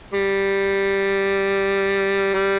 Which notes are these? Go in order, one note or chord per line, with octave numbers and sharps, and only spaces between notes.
G3
G3